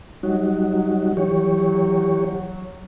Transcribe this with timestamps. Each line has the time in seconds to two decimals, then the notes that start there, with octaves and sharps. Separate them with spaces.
0.23 F#3 G3 D#4 F#4
1.17 E3 G4 C#5